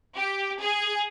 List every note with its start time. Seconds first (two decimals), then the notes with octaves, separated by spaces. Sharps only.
0.17 G4
0.61 G#4